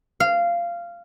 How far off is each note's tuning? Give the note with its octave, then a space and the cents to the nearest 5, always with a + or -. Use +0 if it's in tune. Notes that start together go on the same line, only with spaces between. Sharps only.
F5 -15